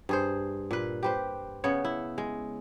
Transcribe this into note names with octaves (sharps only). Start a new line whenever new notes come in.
G2 G#4 C5
A#2 B4
G4 B4 C5
C#3 B3 C#5
E4
G#3